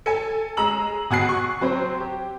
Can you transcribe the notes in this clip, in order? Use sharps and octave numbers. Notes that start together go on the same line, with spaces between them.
A4 G#5
G#3 A#5 E6 F#7
B2 F#4 G#5 F#6 C7
C#6
F#3 C4 C5
G4